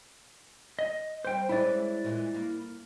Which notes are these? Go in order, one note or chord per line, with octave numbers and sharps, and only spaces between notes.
D#5
G3 C4 C5 G5
E3 G#3 C#4 E4 D5
A#2 E3 G#3
A#3